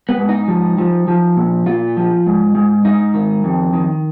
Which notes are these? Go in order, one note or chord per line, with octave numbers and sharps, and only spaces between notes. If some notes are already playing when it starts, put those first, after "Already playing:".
B3
G#2
D#4
F3
F3
F3
A#2
A#2 F4
F3
G#2
G#2
G#2 D#4
D#3
F2
D#3